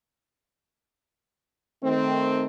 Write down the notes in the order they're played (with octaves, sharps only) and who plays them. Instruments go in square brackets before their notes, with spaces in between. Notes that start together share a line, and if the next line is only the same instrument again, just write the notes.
[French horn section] D#3 A3 C4